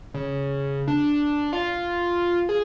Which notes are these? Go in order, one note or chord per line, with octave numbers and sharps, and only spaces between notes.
C#3
D4
F4
G#4